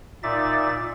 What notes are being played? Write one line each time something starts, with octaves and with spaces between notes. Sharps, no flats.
A#2 D#4 D5 E5 A6